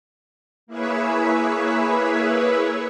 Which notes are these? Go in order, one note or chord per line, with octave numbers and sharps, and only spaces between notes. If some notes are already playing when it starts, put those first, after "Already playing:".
A#3 E4 G#4 B4 C#5 E5